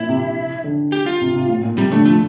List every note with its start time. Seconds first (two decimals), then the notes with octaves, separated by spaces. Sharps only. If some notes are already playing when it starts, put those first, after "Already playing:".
Already playing: A#2 E4
0.09 C3
0.64 D3
0.92 G4
1.06 F4
1.21 C3
1.35 C3
1.49 A2
1.63 A#2
1.78 C3 G3
1.92 D3 A3
2.05 F3 A3